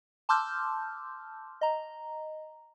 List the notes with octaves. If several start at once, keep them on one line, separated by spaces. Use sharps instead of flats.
A5 C6 D6 E6 F6 G6
D#5 A#5